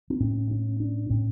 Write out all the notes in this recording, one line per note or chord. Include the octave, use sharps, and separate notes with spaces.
C4
A2 C#4
C#4
D4
A2 C#4